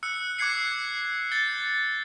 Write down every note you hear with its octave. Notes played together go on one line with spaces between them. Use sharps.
E6 F#6 C#7
D6 F#6 G#6 C7 C#7
G6 A6 C#7 G7